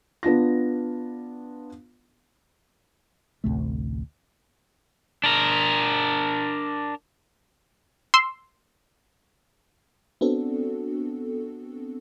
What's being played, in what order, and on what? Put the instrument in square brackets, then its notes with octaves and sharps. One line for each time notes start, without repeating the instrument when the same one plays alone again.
[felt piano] B3 D4 F4 A#6
[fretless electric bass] A1 D2 C3 A3
[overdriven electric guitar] D4 A#4
[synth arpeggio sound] C6 E6
[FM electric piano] B3 C4 D4 F#4 A4